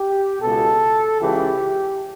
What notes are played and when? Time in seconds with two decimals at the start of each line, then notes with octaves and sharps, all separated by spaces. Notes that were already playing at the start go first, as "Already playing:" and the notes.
Already playing: G4
0.41 C#2 B2 A4
1.21 C#2 C#3 E3 G4